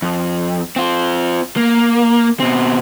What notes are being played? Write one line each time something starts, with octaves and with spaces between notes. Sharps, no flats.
F2
C4 F4
A#3
B2 C4